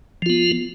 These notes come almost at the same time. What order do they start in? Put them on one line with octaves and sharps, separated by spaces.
F3 F4 B3